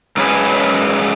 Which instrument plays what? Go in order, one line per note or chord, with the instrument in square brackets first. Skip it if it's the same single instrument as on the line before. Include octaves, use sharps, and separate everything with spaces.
[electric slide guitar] G#2 F#3 C#4 G#4 B4